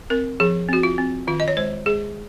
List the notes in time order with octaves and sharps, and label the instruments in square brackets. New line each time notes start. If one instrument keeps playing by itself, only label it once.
[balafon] C4 A#4
F3 G#4
C4 F#4
F4
C4
D#3 F4
D#5
C#5
G#3 C5
G#3 G#4